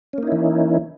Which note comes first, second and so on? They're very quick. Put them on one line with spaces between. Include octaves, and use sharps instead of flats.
C#4 A#3 D#4 E4 E3